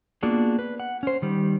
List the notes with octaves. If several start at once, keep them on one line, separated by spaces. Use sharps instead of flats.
A#3 B3 D4 F4 F#4 G#4
B4
F#5
C#4 C5
D#3 G3